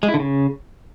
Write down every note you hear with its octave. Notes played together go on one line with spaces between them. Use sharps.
G#3
E4
D3
C#3